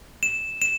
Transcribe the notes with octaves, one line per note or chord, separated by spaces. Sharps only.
E7
E7